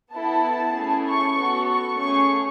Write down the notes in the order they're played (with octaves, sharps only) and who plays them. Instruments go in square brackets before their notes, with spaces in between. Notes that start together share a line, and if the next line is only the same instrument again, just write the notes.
[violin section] B3 E4 A4 A5
A3 C#4 E4 G#4
C#6
B3 F#4 A4
C#6
A3 C#4 G#4 C#6